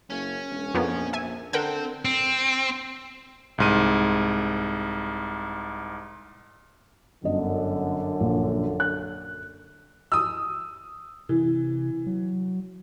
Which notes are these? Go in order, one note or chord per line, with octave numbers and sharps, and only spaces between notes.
F#1 C#4
E1
A#1 F2 A#3 B3
E5 G#5
D3 C4 A#4 F#5 G5
C4
C2 G#2 D#7
G1 F#2 D3 D#5
A#1
F#6
D#6 E6
C3 E3
F#3